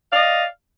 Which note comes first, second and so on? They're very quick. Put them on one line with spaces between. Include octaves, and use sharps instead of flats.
F5 D5 D#5